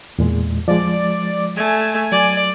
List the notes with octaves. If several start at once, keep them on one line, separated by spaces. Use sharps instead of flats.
E2 A#2 G#3
F3 G#3 D5
A3 G#5
F#3 D5